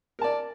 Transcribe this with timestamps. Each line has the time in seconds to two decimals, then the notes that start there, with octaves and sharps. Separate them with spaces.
0.19 A#4
0.21 A5
0.24 D5